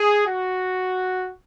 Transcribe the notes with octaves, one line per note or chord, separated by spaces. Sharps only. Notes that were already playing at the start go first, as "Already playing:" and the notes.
Already playing: G#4
F#4